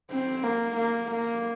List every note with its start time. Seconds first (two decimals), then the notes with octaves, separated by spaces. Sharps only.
0.11 C4
0.44 A#3
0.77 A#3
1.11 A#3